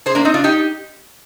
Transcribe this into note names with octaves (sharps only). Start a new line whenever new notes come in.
G#4 C5
A#3 D4
C4 D#4
D4 F4
D#4 G4